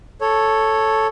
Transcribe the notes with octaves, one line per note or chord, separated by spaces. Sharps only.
A4 C#5